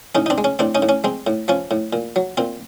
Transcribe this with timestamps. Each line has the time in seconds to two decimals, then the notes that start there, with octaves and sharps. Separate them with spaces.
0.15 A2 C#4 D#4
0.26 D#4
0.30 C4 D4
0.38 G#3
0.44 C#4
0.59 A2 C4 D4
0.75 C#4 D#4
0.82 A2
0.89 C#4
1.04 G#3 C4
1.27 A2
1.48 F3 C#4
1.71 A2
1.93 A#2
2.16 F#3
2.37 A#2 C4